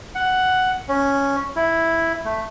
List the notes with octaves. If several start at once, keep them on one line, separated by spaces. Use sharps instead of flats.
F#5
C#4
E4
A3